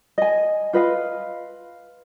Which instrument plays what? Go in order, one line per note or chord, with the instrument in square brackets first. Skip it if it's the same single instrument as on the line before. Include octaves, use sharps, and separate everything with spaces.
[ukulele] D#5 G#5
F4 B4 D#5 F5